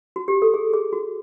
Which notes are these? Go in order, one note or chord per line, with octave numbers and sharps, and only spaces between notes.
F#4
G4
A4
G#4
G#4
F#4